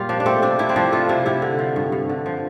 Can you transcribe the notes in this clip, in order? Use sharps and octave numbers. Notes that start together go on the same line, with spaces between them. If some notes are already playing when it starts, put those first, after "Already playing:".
Already playing: A#2 G3 F4 G4
F3 D4
D4
A3 C4
C3 D4
C3 E4
C4
F3 D4
A3 F4
C3 E4
C3 E4
D3
F3
G2
G2
D3
F3